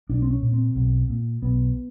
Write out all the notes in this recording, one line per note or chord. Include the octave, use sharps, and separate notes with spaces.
B1 D4
C4
C#4
A#2
C4
B1
A#2
B1 B3